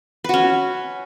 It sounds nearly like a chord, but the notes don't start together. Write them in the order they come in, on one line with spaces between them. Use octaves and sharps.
B4 F#4 C#4